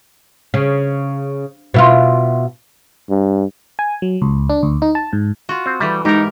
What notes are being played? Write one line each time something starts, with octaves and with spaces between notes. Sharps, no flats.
C#3
B2 E4 F4
G2
G#5
F#3
C#2
D4
D2
D#4
A5
G#2
F4 F#4
C4
E3 G3 A3
G#2 D#4 G4 A#4 D#5